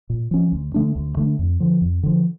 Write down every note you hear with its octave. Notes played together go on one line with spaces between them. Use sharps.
A#2
F3 C#4
D2
D3 A3 D4
D2
D3 A3 D4
F2
D3 F3
F2
D3 F3